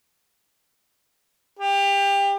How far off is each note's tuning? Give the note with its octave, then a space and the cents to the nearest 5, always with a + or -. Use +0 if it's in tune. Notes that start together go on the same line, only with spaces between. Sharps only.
G4 +25